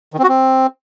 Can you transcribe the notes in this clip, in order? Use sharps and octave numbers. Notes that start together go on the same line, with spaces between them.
D#3
C4
F#4
C4